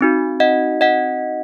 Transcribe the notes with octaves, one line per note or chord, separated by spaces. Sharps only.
C4 D#4 F#4
D#5 F#5
D#5 F#5